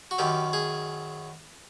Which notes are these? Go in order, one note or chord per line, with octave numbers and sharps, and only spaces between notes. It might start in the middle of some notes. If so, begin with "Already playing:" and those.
F#4
F#2 D#3 F#3 G4
G#4